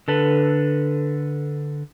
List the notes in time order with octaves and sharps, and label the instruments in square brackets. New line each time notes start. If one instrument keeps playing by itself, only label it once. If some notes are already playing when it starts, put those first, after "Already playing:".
[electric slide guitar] D3 A4 B4